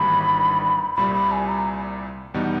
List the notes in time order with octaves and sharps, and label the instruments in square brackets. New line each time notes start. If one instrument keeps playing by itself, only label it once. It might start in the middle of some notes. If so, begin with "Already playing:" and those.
Already playing: [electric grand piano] G#1 G2 E3 G3 A#3 [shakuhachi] B5
[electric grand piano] C2 A#2 G3 [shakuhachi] B5
[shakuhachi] B5
G#5
A#5
[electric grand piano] E2 B2 G3 B3 D#4